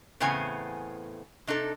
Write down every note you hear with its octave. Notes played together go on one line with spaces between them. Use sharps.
E2 A2 C#3 B3 C4 G#5
C3 D4 D#4 A4